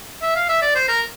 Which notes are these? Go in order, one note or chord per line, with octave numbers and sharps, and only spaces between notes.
E5
F5
E5
D5
C5
A#4